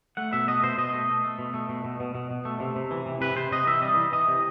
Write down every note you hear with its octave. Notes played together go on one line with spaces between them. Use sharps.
A3 F#5
B2 E5
A3 D#5
B2 C5
B2 D#5
A3
A3
A3
B2
A3
B2
B2
B2
B2
B2
A3
C3
C3
E3
C3
C3 B4
C3 C5
C3 D#5
E3 E5
G3 D#5
E3
E3 D#5
C3